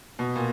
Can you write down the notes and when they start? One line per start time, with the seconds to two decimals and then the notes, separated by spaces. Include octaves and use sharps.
0.19 B2
0.35 A#2